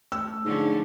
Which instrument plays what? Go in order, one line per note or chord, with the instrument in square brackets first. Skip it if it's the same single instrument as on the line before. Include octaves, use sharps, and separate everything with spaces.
[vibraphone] A3 [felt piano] E6
[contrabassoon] G#2 [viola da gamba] D3 F3 C#4